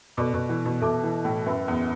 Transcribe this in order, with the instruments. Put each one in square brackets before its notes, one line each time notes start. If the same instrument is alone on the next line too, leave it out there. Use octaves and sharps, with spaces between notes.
[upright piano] B2 [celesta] A4 D5 B5 D6
[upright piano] B2
E3
B2
[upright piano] B2 [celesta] A4 E5 A5 D6
[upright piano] E3
A2
[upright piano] F#2 [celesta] B4 E5 B5
[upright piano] E2